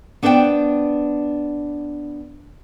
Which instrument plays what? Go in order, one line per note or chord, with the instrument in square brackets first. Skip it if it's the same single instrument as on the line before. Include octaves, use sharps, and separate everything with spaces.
[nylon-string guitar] B3 D4 B4 C5 E5 G5